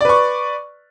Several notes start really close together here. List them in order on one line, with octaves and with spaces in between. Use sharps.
D5 B4 C#6